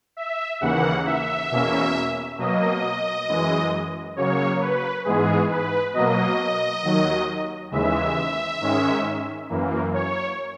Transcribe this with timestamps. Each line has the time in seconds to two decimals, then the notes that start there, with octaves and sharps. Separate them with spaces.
0.17 E5
0.61 D#2 C#3 E3 A#3 F#5
1.06 E5
1.50 E2 B2 A#3 C#4
2.38 B2 F#3 A#3 D#5
3.28 F#2 E3 G#3
4.16 C#3 F#3 A#3 C#5
4.61 B4
5.05 G#2 E3 G#3 B3 G#4
5.49 B4
5.93 B2 F#3 A#3 D#5
6.82 D#2 D#3 F#3
7.71 D#2 C#3 E3 G#3 E5
8.61 G#2 D#3 G#3 C#4
9.49 F#2 E3 A#3
9.94 C#5